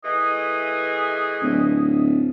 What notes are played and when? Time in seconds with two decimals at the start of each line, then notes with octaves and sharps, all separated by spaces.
0.05 E3 A3 G#4 D#5
1.42 D1